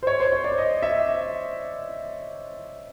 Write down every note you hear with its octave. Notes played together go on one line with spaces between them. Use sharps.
C5
C#5
C5
C#5
D5
D#5
E5